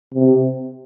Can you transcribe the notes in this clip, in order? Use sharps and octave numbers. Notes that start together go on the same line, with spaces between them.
C3